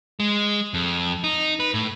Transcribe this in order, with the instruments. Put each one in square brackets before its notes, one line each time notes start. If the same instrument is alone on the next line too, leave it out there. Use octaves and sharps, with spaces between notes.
[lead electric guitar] G#3
F2
D#4
B4
A2